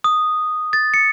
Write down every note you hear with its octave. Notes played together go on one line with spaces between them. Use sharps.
D#6
A6
C#7